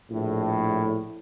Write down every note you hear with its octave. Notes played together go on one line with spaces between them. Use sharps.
A#1 A2